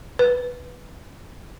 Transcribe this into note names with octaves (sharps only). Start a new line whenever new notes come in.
B4